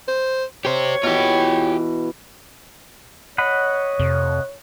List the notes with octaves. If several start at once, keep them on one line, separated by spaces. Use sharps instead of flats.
C5
G4 C5 C#5
B2 E3 F4 G4
C#5 D#5 F#5 B5
F2 C3